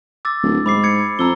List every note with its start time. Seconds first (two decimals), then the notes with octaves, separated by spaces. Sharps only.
0.25 D6 E6 A6
0.43 D1
0.66 G#2 B5 D6 C7
0.84 G#6 C#7
1.19 F2 A#5 E6 G7